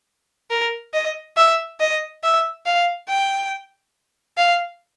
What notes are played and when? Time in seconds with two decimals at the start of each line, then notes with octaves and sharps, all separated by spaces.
0.51 A#4
0.94 D#5
1.37 E5
1.80 D#5
2.23 E5
2.66 F5
3.09 G5
4.38 F5